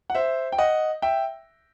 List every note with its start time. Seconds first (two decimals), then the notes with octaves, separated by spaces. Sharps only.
0.10 F#5
0.15 C5 E5
0.52 G5
0.58 D#5 F#5
1.02 E5 G5